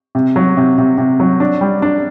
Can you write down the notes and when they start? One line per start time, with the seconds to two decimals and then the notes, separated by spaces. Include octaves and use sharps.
0.15 C3
0.36 F#3
0.57 C3
0.78 C3
0.98 C3
1.20 F#3
1.40 D4
1.61 G3
1.82 D4